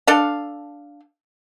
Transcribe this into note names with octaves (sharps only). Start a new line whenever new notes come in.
D4 A4 F5